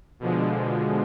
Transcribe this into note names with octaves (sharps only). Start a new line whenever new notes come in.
B2 D3 F3 G#3